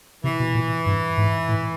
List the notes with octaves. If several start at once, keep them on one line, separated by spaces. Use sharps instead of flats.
C3 E3
B2
A#2
G2
G#2
A2